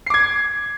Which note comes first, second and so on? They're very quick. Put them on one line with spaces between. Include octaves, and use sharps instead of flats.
C7 D6 G#6